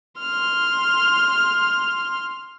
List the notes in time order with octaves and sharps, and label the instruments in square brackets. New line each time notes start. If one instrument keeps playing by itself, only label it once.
[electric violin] C6 F6